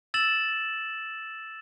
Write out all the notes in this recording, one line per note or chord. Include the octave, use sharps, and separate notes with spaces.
E6 A6 E7 F#7